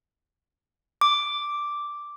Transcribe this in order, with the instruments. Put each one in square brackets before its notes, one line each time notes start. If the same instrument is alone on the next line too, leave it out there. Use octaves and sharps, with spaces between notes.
[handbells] D6